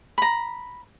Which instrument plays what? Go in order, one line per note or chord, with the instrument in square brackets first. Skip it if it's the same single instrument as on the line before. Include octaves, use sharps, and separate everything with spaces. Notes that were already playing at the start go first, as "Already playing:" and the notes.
[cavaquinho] A#5 B5